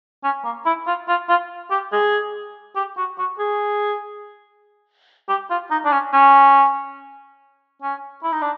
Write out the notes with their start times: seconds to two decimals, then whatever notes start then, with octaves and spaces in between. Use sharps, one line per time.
0.24 C#4
0.44 A#3
0.66 E4
0.87 F4
1.09 F4
1.29 F4
1.71 G4
1.93 G#4
2.76 G4
2.97 F#4
3.19 F#4
3.39 G#4
5.29 G4
5.50 F4
5.71 D#4
5.85 D4
5.92 C#4
6.13 C#4
7.82 C#4
8.23 E4
8.32 D#4
8.42 D4